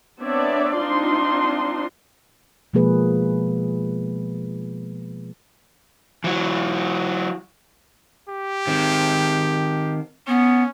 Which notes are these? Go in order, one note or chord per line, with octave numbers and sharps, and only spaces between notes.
B3 C4 D4 C#5 D5 E5
C4 D4 D#4 F4 C6
B2 F3 G#3 A#3 G#4 B4
E3 F#3
G4
D#3 C4
B3 C#4